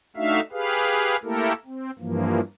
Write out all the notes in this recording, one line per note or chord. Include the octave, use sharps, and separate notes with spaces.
A3 D4 D#4 F#4 E5 F5
G4 G#4 B4 F5
A3 A#3 E4 G4 A4 A#4
C4
G2 E3 F3 A#3